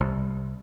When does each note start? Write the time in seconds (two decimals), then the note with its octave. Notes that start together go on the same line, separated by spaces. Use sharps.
0.01 C2